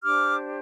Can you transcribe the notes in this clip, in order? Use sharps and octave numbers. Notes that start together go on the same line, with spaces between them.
D4 G4 C5 D6 F6